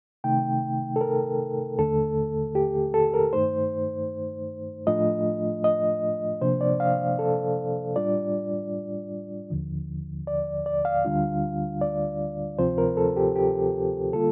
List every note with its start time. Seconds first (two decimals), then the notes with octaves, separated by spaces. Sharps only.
0.24 C3 D#3 A3 D#4 G5
0.96 A4
1.01 A#4
1.79 D#2 D3 A3 A4
2.55 G4
2.94 A4
3.14 A#4
3.33 G2 D#3 A3 D#4 C5
4.87 A2 F3 A3 D4 F4 D#5
5.64 D#5
6.41 C3 F3 A#3 D4 C5
6.61 D5
6.80 F5
7.19 A4
7.96 A2 G3 D4 F4 D5
9.50 D#2 D3 F3
10.27 D5
10.66 D5
10.85 F5
11.05 D2 D3 G3 D4 F4
11.81 D5
12.59 D2 C3 F3 C4 F4 C5
12.78 A#4
12.97 A4
13.16 G4
13.36 G4
14.13 D3 G3 A#3 F4 A4